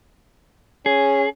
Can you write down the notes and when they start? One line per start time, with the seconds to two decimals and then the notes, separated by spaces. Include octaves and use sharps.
0.86 C#4 G#4